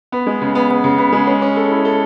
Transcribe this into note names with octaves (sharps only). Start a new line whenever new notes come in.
B3
G#3
C#3
B3
B3
C#3
B3
G#3
C#4
C#4
A4
E4
A4